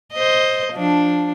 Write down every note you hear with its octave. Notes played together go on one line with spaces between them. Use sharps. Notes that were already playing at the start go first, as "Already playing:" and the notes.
C5 D#5
F3 D4